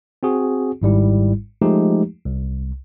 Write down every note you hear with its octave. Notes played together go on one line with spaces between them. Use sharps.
C4 F#4 G#4
G#1 G#2 G3 E4
F3 G#3 A3 D#4 G4
C2